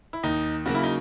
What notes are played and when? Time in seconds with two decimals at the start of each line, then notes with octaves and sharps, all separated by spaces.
0.13 E4
0.23 D#2 D#4
0.66 C#3 F#3 A#3 F#4
0.75 E4
0.83 D#4